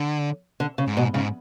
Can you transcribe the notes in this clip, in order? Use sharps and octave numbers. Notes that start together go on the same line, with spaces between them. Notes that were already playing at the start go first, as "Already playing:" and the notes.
Already playing: D3
D3
C#3
G#2
B2
G#2 C#3